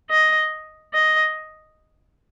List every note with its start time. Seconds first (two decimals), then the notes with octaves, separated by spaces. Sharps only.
0.10 D#5
0.94 D#5